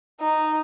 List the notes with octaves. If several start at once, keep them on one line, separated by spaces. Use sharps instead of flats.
D#4